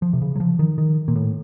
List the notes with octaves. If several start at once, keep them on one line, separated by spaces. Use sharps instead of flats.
F3
C3
C#3
F#3
F3
D#3
D#3
A#2
A2